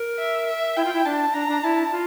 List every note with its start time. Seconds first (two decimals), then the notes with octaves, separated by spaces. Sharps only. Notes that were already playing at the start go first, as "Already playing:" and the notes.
Already playing: A#4
0.19 E5
0.47 E5
0.76 E4 G5
0.85 F4
0.93 E4
1.05 D4 A5
1.34 D4 A#5
1.48 D4
1.63 E4 A5
1.92 F4